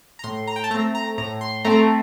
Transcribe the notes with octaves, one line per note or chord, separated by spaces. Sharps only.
A#5
A2 C6
A#5
G5
A5
A3 C4 A#5
A#5
A2 A#5
C6
A3 C4 A#5